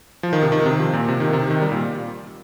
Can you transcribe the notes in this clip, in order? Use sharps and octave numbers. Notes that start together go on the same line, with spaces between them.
F3
D#3
C3
D#3
C3
F3
A#2
C3
D#3
C3
D#3
G3
A#2